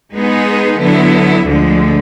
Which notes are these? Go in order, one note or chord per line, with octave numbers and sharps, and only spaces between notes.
G#3 B3 D#4 G#4 B4
D3 F#3 B3 E4
D2 D3 F3 G#3